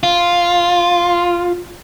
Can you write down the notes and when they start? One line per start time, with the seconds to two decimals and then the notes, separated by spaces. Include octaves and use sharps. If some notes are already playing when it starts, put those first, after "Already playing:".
0.03 F4